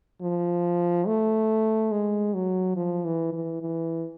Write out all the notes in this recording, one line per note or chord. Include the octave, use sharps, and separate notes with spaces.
F3
A3
G#3
F#3
F3
E3
E3
E3